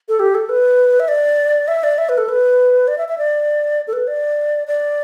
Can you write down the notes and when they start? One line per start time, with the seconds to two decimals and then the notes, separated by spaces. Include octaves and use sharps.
0.09 A4
0.20 G4
0.35 A4
0.49 B4
1.00 E5
1.08 D5
1.68 E5
1.84 D5
1.98 E5
2.09 B4
2.18 A4
2.29 B4
2.88 D5
2.98 E5
3.08 E5
3.18 D5
3.88 A4
3.93 B4
4.07 D5
4.67 D5